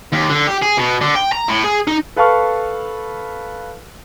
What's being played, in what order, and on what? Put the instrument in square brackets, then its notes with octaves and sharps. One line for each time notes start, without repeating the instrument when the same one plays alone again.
[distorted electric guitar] D#2
D3
G4
G#4
B2
D3
G5
A#5
A2
G#4
D#4
[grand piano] A4 B4 F5 A5 C#6 F6